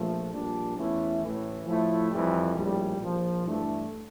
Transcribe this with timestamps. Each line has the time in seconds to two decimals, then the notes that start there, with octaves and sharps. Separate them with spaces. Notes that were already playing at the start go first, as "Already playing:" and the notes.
Already playing: A#1 A#2 F3 A3
0.32 A#1 A#2 G3 D4
0.76 E2 E3 A3 C#4 E4
1.22 A1 A2 E3
1.66 A2 F3 A3 E4
2.10 F2 E3 G3
2.55 A#1 A2 G3
3.00 A#1 A#2 F3
3.44 G2 E3 A3 D4